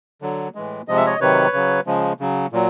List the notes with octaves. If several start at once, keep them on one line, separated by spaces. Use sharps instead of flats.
D3 F#3
A2 E3 G#3
C3 F3 G#3 D#5
E5
C#5 D#5
C3 D#3 F#3 B4 C#5
C#3 F#3
C#3 F3 G#3
C#3 F#3
A#2 F#3